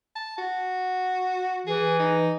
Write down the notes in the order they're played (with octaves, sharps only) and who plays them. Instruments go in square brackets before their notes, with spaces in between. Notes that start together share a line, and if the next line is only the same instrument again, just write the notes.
[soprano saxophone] A5
F#4
[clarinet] E3 [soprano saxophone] G#4
[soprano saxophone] D#4